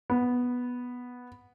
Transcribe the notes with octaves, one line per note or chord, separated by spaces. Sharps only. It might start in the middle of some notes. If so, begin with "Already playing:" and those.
B3